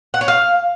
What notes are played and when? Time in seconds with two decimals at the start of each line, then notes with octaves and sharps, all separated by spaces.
0.14 F#5
0.21 C#5
0.28 F5